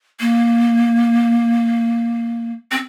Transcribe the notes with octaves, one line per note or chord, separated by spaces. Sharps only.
A#3
C4